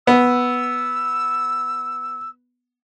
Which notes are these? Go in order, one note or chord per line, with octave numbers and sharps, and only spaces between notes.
B3 E6